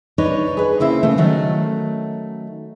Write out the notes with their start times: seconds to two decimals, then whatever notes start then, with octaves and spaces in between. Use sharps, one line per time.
0.18 D4 D#4 B4 C#5
0.57 G#4 B4
0.80 C#3 A#3 C4 E4 C5 E5
1.03 C#3 A3
1.17 D#3 F#3 A3 C#4 D#4